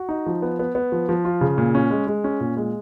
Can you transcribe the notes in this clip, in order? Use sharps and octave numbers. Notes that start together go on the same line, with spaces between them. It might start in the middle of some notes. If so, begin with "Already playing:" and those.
Already playing: F#4
D#4
F3
B3
B3
B3
F3
F3
F4
C#3
A#2
C#4
G#3
G#3
C#4
A#2
G#3